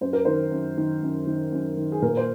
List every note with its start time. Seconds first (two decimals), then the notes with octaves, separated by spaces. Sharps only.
0.01 F#2 C5
0.13 A#4
0.25 D#3 C5
0.51 F#2
0.77 D#3
1.02 F#2
1.27 D#3
1.52 F#2
1.77 D#3
1.92 G#4
2.02 A#2 A#4
2.17 C5